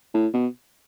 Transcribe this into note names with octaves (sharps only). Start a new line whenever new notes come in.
A2
B2